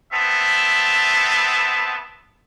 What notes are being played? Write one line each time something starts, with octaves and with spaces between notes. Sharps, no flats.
B3 C4 E5 A5